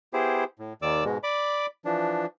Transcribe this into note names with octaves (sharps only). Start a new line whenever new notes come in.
B3 E4 G4 G#4 C5
A2
D#2 D#3 D5 D6 E6
G#2 B2 G#3
D5 B5 D6
E3 F3 D4